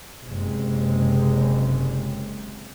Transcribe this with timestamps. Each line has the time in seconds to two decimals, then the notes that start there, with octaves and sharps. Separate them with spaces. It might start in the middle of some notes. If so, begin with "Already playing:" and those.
0.23 F#1 C3 G#3